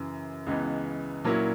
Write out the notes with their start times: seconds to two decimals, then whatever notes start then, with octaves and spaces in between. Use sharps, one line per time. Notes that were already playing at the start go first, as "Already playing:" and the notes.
Already playing: F#2 C#3 E3
0.46 C#2 C#3 E3 G#3 B3
1.24 A#2 F#3 A#3 C#4 E4